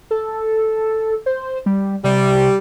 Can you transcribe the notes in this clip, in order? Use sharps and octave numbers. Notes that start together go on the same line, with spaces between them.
A4
C5
G3
C3 G3